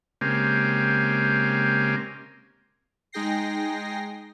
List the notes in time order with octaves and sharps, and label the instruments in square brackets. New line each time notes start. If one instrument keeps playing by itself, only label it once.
[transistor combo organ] C#3 G#3 A#3 C4 G4
[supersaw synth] G#3 D#4 G#4 G5 A#6 C7